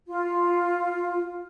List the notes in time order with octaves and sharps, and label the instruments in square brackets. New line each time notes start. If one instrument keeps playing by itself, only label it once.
[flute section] F4